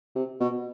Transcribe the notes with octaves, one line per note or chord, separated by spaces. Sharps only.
C3
B2